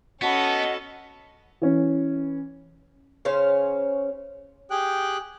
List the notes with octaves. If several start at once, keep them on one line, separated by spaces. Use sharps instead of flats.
B3 C#4 F#4 A4 D#5 F#5 A5 B5
E3 C#4
C#3 C#4 C5 F5
G4 G#4 G5 F#6